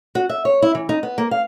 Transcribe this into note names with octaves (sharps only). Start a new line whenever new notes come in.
F#4
E5
C#5
E4
E3
D#4
B3
A#3
F5